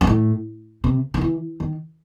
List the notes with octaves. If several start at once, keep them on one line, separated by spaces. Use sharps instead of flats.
G2
A2
C3
D#3
E3
D#3